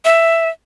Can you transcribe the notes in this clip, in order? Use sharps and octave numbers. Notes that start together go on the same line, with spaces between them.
E5